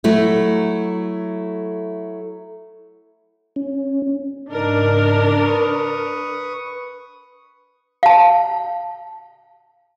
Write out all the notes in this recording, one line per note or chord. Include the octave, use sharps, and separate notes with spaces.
F#3 A3 E4
C#4
G#2 C#3 D4 D#4 A#4
B4 C#6 D#6
F5 A5